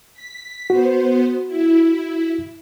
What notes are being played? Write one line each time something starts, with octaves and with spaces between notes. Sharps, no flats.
B6
B3 F#4 C5
E4